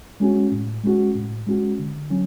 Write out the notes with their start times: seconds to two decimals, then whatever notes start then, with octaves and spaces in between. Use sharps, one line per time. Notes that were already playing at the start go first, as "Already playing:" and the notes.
0.20 G#3 C#4 F#4
0.52 A2
0.84 G#3 C#4 F#4
1.15 A2
1.47 G#3 C#4 F#4
1.79 D3
2.10 F#3 C#4